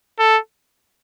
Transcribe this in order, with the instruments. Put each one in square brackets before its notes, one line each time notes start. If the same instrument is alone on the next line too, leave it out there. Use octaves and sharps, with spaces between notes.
[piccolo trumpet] A4